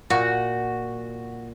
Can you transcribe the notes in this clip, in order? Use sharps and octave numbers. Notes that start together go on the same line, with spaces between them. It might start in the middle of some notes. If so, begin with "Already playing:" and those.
A#2 F#4